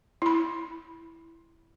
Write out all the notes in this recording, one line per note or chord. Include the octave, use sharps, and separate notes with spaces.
E4 B5